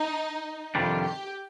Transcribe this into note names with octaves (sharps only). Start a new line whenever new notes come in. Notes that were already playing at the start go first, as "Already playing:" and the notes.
Already playing: D#4
F2 C3 D#3 G3 D4 F4
G4